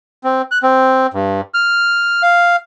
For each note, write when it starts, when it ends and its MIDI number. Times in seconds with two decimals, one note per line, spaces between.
0.24 0.42 60
0.51 0.59 90
0.63 1.07 60
1.14 1.41 43
1.54 2.22 89
2.23 2.56 77